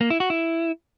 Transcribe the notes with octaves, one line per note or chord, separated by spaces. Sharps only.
A#3
E4
F#4
E4